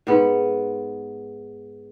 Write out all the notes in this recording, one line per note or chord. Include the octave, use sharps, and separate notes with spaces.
G#2 B3